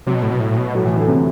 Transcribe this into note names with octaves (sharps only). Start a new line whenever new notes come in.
C3 F#3
B2
A2
B2
A2
B2
A2 F#3
E3
D3
C3